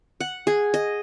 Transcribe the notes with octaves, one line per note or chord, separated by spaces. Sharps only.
F#5
G#4
D#5